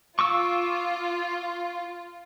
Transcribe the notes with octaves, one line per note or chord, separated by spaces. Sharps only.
F4 C#6 D6 E6